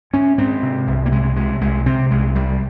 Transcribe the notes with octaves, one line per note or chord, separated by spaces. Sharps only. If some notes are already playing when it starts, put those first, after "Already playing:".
G#2 C#4
G#2 C4
C3
C2
A#3
C3 G#3
C3 G#3
C2 G#3
C3 C4
C2 G#3
C2 G3